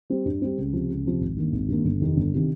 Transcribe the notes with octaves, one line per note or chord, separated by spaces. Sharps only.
G3 C4
G2
G3 C4
C#2
C3 F3
C#2
C3 F3
G#1
G2 D#3 A#3
G#1
G2 D#3 A#3
G1
F2 C3 D#3
G1
C3 D#3